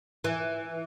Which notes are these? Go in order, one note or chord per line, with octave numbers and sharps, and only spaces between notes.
E3